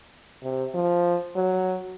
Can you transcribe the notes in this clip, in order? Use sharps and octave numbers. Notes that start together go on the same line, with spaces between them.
C3
F3
F#3